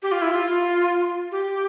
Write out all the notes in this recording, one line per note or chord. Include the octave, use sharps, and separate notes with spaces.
G4
F4
E4
F4
G4